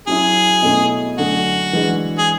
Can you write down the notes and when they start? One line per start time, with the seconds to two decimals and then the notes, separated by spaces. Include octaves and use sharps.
0.07 F#3 C#4 E4 G#4
0.62 B2 A3 C#4 E4
1.18 D3 F#3 A3 C#4 F#4
1.73 E3 G#3 D4
2.18 G#4